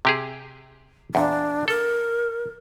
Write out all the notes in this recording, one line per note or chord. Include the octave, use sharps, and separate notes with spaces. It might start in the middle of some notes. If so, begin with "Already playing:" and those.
C3 G4 G#4
E2 A#2 D4
A4 A#4